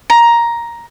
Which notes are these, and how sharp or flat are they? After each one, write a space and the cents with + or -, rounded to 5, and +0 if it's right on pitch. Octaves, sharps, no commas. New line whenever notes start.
A#5 +10